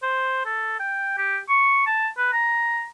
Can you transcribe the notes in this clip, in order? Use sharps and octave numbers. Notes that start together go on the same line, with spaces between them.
C5
A4
G5
G4
C#6
A5
B4
A#5